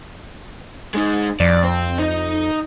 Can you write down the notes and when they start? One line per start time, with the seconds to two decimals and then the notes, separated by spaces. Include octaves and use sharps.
0.95 G#3 D#4
1.40 F2 D5
1.63 C4 C5
1.98 D#4 D#5